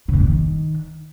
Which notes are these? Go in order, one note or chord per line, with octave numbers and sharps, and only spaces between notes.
C#3
A#2
D#3